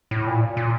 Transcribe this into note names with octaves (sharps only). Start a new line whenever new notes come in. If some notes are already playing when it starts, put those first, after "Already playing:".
A2
A#2
A#2